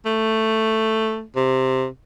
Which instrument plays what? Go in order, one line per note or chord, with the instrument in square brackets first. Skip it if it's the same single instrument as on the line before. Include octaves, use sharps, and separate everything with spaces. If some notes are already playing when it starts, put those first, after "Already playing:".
[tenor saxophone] A3
C3